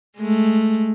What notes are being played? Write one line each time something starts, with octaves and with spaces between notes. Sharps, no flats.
G#3 A3